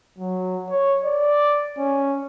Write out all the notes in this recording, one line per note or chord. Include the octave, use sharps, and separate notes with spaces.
F#3
C#5
D5
C#4